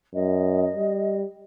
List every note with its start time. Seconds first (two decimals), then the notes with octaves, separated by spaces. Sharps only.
0.15 F#2 D#5
0.76 G3